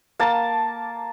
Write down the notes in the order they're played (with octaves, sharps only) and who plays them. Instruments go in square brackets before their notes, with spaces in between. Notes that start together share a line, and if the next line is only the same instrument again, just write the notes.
[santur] A#3 A5